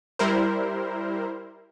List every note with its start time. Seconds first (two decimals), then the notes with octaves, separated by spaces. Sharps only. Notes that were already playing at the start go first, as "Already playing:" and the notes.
0.19 G3 E4 A#4 C5